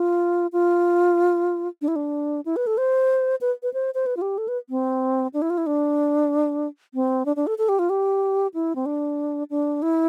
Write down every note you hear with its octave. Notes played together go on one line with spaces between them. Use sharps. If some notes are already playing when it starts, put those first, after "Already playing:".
Already playing: F4
F4
D4
E4
D4
E4
B4
A4
C5
B4
B4
C5
C5
B4
F4
G4
A4
B4
C4
D4
E4
F4
E4
D4
C4
D4
D4
A4
A4
G4
F4
G4
E4
C4
D4
D4
E4